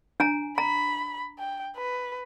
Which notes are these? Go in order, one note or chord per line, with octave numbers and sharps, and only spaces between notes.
D4 G#5 A#5
A#5 B5
G5
B4